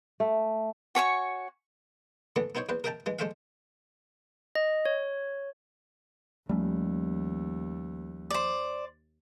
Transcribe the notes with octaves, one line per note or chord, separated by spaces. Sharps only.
A3
F#4 C#5 G#5 C#6
D3 E3 A3 B3
B3 D#4 E4 C5 C#5
E2 B4 C5
A#4 D#5 E5 G5 A5 A#5
E3 G#3
G#3 A3 C5 D5 E5 F5
D#5
C#5
D#2 F3 G3 A3 C#4
C5 D5